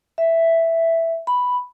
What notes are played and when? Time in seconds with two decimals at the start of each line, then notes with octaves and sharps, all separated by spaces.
0.18 E5
1.27 B5